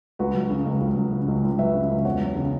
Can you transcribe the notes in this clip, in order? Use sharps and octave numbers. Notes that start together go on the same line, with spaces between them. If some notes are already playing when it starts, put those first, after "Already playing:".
C#2 F#4 B4
F#3
C#3
C#2
C#2
F#3
C#3
C#2
C#2
F#3 B4 E5
C#3
C#2
E2 C#5 F#5
F#3
C#3